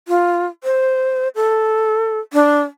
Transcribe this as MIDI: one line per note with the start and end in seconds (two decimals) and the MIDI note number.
0.08 0.46 65
0.64 1.28 72
1.35 2.20 69
2.33 2.61 62